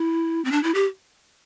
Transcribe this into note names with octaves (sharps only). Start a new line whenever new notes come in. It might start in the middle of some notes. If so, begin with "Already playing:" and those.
Already playing: E4
C4
D4
E4
G4